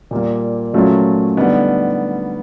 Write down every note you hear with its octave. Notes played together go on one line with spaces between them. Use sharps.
A#2 G3 A#3
A#2 F#3 A3 C#4 F4
D3 G3 B3 D#4